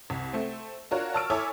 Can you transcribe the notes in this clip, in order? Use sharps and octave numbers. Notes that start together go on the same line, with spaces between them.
C2
A3 C4
D4 F4 F#4 A#4 C#5
A5 C#6 E6 F6 D7
E4 A4 C#5 G#5 D6 E6